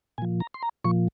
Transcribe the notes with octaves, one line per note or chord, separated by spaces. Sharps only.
A#2 F3 G#5
A#5
C6
A#5
A#2 F3 C#6